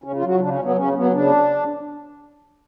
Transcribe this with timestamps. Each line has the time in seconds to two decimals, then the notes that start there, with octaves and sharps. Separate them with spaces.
0.04 C#3 C#4
0.16 F4
0.22 F#3
0.28 F#4
0.40 C#3 D4
0.52 C#4
0.59 F#3
0.64 B3
0.76 C#3 C#4
0.94 F#3 B3
1.13 C#3 D4